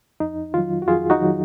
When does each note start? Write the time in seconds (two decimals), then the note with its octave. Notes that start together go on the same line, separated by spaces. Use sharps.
0.20 F2 D#4
0.54 D#3 F#3 F4
0.82 F#4
0.87 F2 F4 G#4
1.10 D#4 F#4
1.21 D#3 F#3